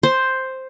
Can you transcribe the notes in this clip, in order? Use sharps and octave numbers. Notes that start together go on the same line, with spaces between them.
C5